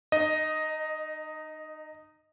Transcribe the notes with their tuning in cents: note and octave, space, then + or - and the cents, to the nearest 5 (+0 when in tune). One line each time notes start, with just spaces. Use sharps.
D#4 -25 D#5 +0